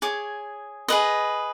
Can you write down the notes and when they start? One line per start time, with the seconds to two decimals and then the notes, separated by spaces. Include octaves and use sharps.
0.02 G#4 C#5 D6
0.88 G#4 B4 D#5